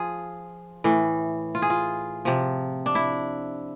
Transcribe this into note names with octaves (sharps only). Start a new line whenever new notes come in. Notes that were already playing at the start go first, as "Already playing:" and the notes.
Already playing: F3 F4 G#4
A2 E3
F4
G#4
F4
C3 F3
D4
E4